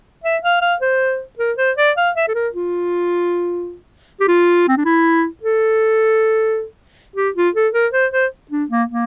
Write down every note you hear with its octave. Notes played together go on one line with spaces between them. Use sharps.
E5
F5
F5
C5
A#4
C5
D5
F5
E5
A4
A#4
F4
G4
F4
C4
D4
E4
A4
G4
F4
A4
A#4
C5
C5
D4
A#3
A#3